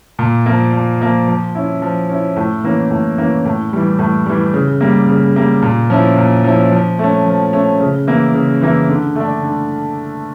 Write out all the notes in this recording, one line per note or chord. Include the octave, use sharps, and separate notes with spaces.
A#2
F3 A#3
A#2
F3 A#3
F3
C#4 E4
F3
C#4 E4
A2
E3 A#3 C#4
A2
E3 A#3 C#4
A2
E3 G3
A2
E3 G3
C#3
G3 A#3
C#3
G3 A#3
A#2
F3 C#4 E4
A#2
F3 C#4 E4
F3
A3 C#4
F3
A3 C#4
C#3
E3 A#3 E4
C#3
E3 A#3 E4
D3
A3 D4
D3